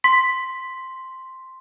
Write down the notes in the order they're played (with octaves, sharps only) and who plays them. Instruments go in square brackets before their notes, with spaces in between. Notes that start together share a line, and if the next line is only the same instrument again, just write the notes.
[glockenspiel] C6 [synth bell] B6